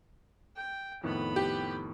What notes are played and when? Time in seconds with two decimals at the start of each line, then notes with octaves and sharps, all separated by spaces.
0.56 G5
1.03 F2 A2 D#3 B3 B5
1.36 G4